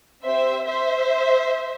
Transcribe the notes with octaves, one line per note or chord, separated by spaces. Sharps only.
C4 G4 C5 E5
C5 E5